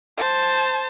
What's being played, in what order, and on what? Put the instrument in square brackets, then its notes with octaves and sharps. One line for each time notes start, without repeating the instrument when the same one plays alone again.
[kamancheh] C5 A5